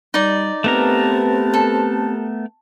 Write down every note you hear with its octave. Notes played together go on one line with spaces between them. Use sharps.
G3 D#4 D5
A3 B3 C4 G4 A#4 B4 A5
A4